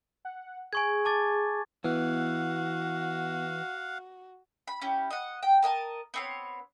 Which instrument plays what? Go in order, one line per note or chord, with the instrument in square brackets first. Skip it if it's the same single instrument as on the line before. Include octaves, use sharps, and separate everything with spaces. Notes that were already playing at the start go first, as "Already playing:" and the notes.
[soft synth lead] F#5
[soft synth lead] G#4 [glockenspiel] G#5 C#6 G#6
[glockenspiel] A5 D6 A6
[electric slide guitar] E3 [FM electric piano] B3 [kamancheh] F#4 [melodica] F5 F#5
[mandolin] B5
C#4 E4 G4
D#5 F#5
G5
A#4 D#5 G5 A5
B3 C4 C#5